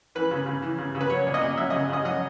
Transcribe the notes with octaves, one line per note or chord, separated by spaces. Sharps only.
E3 B4
C#3
C#3
E3
C#3
C#3
B4
F#3 C#5
A#2
D#5
A#2
F#3 E5
D#5
C#3
C#3 D#5
F#3 D#5